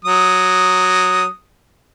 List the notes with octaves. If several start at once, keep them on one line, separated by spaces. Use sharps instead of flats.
F#3 D#6